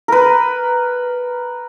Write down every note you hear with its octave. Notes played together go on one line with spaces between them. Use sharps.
A#4 B4